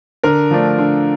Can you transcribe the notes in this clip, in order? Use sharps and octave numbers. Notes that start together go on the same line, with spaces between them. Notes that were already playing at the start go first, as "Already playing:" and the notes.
D3 A#4
F3 A3 D4
D3